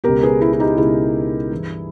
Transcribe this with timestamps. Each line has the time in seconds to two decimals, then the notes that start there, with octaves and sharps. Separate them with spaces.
0.04 C#2 B2 G4 A#4
0.22 G#4 B4
0.41 E4 G#4
0.53 E4
0.60 D#4 G4
0.77 C#2 B2 E4 G#4
1.51 G2 E3